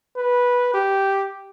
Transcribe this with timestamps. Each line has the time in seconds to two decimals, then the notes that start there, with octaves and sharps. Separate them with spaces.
0.17 B4
0.74 G4